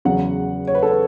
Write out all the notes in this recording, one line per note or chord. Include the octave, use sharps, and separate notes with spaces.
E2 C#3 F#3 F#5
C#5
B4
A4
B4